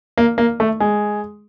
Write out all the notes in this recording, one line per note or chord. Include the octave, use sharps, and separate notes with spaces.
A#3
A#3
A3
G#3